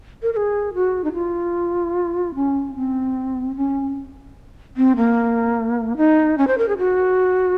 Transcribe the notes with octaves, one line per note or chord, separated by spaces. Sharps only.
A#4
A#4
G#4
F#4
D#4
F4
C#4
C4
C#4
C4
A#3
D#4
C#4
C5
A#4
G#4
F#4